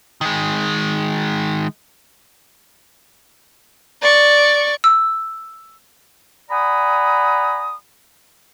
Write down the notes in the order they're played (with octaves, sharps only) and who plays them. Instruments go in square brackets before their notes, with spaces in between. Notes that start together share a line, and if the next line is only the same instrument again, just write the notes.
[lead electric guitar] D#3 G#3
[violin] D5 C#6
[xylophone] E6
[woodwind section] D5 F#5 G#5 A#5 B5 D#6